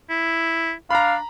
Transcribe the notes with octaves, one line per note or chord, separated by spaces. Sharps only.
E4
D4 F5 A#5 B5